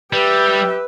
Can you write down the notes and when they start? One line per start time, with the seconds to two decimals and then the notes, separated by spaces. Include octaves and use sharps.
0.13 G3 G4 B4 E5